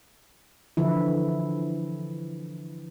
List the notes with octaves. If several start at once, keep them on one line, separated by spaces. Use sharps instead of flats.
D3 E3 F3 E4